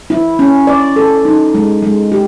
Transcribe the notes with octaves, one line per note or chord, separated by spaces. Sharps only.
E4
C#4
D5
A4
D#4
G#3
G#3
G4